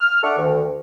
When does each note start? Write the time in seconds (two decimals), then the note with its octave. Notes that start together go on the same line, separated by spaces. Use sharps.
0.01 F6
0.23 D4 A4 E5 F#5 C#6 D6
0.38 D2 D#3